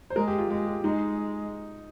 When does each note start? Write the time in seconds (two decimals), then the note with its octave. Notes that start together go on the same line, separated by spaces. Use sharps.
0.10 C5
0.16 G#3 A#4
0.27 G4
0.38 F4
0.50 G#3 G4
0.66 G4
0.83 G#3 D#4